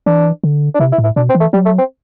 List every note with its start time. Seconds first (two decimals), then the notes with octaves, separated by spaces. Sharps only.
0.06 E3 D4
0.44 D3
0.74 D4
0.80 C3 E4
0.92 E4
0.98 A2
1.04 E4
1.16 B2 D4
1.29 C4
1.35 E3
1.40 A3
1.53 F#3 G3
1.65 A3
1.78 C4